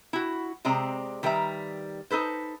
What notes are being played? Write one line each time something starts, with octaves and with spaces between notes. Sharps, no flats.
E4 F#4
C3 G#3 C4 D5 A#5
D#3 G3 B4 E5 A#5
D#4 A4 B4 C5